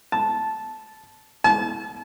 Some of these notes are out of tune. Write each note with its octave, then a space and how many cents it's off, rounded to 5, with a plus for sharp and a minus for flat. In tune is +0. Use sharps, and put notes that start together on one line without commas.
A5 -10
A5 -40